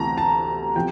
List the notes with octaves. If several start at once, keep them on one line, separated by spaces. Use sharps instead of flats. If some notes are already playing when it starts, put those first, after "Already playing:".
Already playing: D2 C3 E3 A5 A#5
A5
C3 F3 G5